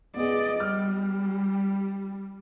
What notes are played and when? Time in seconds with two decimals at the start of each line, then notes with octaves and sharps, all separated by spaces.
0.16 B3 G#4 D5 D#5
0.60 G3 F6